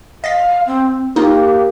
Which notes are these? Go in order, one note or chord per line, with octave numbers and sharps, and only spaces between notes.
D#5 F5 A6 B6
C4
A#3 D#4 F4 G4